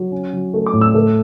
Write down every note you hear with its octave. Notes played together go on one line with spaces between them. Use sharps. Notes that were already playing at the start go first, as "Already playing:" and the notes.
Already playing: F#3
C#4
F#3
A3
D6
A2
E6
A3